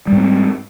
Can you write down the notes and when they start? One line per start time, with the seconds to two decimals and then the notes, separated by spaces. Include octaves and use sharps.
0.07 G3
0.12 G#2
0.17 C4